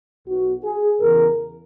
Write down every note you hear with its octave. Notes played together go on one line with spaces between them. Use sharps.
B1 B2 F#4
G#4
E2 C#3 E3 A#4